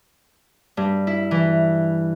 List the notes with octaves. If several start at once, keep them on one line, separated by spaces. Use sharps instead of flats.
G2
E4
E3